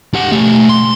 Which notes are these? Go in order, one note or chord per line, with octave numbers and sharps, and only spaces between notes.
G4 F#5
A3 G4
C6